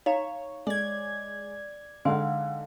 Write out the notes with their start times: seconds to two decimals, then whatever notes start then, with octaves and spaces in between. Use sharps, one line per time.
0.06 D#4 C#5 F5 A#5
0.67 G#3 D5 G#6
2.05 D3 G#3 D#4 F5 F#5 G#5 C6